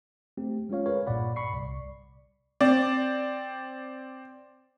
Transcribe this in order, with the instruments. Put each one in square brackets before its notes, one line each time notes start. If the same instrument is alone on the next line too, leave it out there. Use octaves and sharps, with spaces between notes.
[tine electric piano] A3 C4 G4
G#3 C#4 F4 C#5 F5
G#4 A#4 B4 C#5 F5
B1 G2 A#2 D5 F#5 B5
B5 C#6 C7
C2 D5
[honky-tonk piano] C4 D5